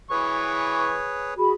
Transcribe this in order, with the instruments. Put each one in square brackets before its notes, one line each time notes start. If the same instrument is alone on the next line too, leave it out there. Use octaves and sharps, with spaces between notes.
[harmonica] E3 C#6 [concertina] G#4 B4 C#5
[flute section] F#4 G#4 B5